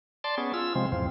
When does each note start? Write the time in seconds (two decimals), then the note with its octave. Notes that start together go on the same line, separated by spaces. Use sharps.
0.24 D5 A5 C6
0.38 B3 C#4 G#4
0.54 F4 E6
0.75 C3 F3 G#3 C4
0.92 E2 G#2 F3 C4